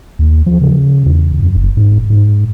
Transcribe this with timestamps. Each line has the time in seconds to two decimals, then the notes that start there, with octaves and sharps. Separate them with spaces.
0.19 D#2
0.46 F3
0.61 C#3
1.06 E2
1.40 F#2
1.57 F#1
1.77 G#2
2.10 G#2